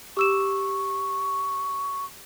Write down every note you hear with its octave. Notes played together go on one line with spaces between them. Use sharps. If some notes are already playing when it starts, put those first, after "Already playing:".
G4 C#6 E6 E7